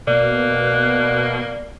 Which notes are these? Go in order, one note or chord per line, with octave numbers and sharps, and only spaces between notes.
B2 A#3 D5 F#6